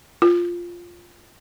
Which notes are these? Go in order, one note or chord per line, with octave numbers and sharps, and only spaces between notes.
F4